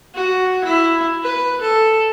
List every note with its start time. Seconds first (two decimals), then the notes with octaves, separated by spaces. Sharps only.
0.15 F#4
0.65 E4
1.23 B4
1.61 A4